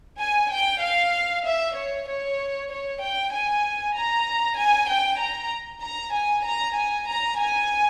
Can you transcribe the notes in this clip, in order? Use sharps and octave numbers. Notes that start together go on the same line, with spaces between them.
G#5
G5
F5
E5
C#5
C#5
C#5
G5
G#5
A#5
G#5
G5
A#5
A#5
G#5
A#5
G#5
A#5
G#5